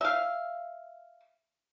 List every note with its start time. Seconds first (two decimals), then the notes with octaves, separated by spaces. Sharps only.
0.01 E5 F5